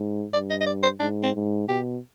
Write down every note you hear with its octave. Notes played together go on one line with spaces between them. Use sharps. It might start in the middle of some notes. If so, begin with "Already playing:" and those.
Already playing: G#2
G2 D5
D#5
D#5
D5
C5
G#2 D4
C4
G#2
B2 G4